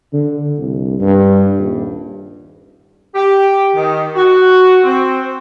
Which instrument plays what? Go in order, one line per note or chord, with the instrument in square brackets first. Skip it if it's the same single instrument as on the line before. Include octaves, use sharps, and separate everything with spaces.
[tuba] D3
C2
G2
D#1
[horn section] G4
D#3
F#4
C4